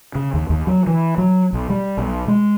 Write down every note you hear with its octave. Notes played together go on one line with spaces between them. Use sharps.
C#3
D#2
D#2
F#3
E3
F#3
B1
G3
B1
G#3